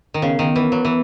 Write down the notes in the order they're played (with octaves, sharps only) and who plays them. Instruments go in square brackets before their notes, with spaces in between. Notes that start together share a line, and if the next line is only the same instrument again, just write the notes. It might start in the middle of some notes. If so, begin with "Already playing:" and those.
[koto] D#3
[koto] C#3 [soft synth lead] B3
[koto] D#3
E3
F#3
E3